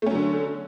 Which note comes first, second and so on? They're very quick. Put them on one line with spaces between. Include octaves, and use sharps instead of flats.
A3 C#4 F#3 D3